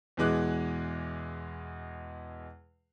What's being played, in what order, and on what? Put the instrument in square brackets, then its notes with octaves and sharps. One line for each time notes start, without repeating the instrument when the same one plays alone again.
[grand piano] E2 B2 E3 G#3 D6 F#6